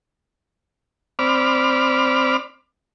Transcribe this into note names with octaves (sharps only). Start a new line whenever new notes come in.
C4 D5 B5 D6 F6